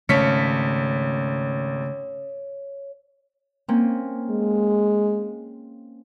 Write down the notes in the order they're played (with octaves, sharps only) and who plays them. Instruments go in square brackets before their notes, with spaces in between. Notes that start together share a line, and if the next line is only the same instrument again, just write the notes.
[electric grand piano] G#1 B6 C#7 [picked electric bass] C#3 A3 [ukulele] C#4 [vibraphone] C#5
[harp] A#3 C4 C#4
[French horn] G#3